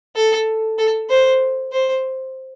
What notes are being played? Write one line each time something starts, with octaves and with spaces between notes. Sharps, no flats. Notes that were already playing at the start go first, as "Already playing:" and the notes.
A4
A4
C5
C5